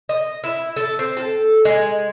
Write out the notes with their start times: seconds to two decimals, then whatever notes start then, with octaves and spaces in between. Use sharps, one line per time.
0.09 D#5
0.44 E4
0.77 A4
0.99 C4
1.17 A4
1.65 G#3